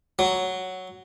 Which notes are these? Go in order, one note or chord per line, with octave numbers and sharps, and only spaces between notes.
F#3